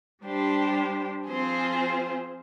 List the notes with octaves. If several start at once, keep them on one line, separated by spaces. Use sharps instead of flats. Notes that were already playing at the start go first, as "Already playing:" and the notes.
G3 D4 G4 C5
F3 C4 F4 G#4 C5